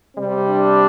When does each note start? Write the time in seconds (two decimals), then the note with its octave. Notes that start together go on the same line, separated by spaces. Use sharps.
0.18 C3 G3 C4
0.49 D4